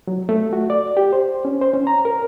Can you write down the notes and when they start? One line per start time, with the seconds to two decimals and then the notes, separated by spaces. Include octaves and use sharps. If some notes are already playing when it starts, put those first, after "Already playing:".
0.07 F#3
0.29 A3
0.53 F#4
0.70 D5
0.97 G4
1.13 C5
1.45 C#4
1.61 C5
1.74 C#4
1.87 A#5
2.05 A#4